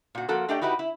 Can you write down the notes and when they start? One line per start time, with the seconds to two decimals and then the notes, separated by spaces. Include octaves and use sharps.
0.15 A#2 F#4
0.29 F3 A#3 F#4 A4
0.49 A3 D4 G4 D5 D#5 G5
0.62 D#4 E4 F#4 G4 B4
0.79 E4